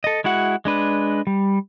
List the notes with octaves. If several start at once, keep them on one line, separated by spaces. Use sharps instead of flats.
A4 D#5
G#3 E4 F#4 F#5
G#3 D4 B4
G3